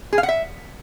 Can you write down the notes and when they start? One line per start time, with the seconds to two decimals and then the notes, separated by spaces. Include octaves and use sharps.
0.13 G#4
0.18 F5
0.23 F#5
0.28 E5